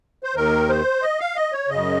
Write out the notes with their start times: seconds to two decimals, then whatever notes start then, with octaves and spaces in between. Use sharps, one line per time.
0.23 C5
0.35 D#2 D#3 A#4
0.69 C5
1.02 D#5
1.19 F5
1.36 D#5
1.52 C#5
1.68 F#2 C#3 D#5